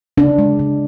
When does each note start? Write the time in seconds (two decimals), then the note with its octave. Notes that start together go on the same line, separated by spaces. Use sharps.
0.18 C#3 D4
0.39 G#3
0.59 C#3